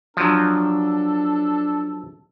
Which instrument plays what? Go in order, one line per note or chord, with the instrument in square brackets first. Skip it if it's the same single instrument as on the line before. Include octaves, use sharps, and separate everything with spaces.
[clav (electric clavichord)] F3 F#3 [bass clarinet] D4 [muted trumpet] A4